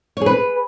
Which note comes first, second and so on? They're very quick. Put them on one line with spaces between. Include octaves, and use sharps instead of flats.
C#5 G#4 B4